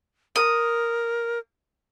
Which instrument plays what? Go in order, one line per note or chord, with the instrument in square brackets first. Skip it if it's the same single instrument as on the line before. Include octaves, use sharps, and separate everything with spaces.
[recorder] A#4 [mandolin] D#6